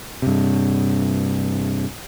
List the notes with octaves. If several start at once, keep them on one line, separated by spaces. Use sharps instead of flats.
G2 C3